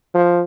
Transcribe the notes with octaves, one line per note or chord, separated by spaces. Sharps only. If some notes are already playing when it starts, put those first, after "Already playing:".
F3